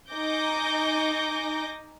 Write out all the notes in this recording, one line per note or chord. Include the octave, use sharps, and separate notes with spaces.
D#4 D#5 G#5 D6 G6 A#6